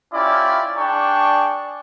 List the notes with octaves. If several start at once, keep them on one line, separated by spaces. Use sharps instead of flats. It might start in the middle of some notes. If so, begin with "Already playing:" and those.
C#4 E4 F4 G4 D5
D4 G#4 D5 G5 C#6